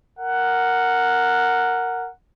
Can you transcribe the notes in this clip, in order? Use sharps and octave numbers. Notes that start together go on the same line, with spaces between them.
A#4 F#5